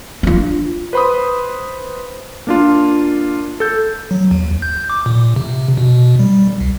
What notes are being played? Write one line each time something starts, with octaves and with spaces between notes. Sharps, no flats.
D4 F4
B4 C5 B5 C6 D#6
A#3 D4 F4
A4 G6
F#3
D#2
G6
D6
A#2
C3
B2
G3
C2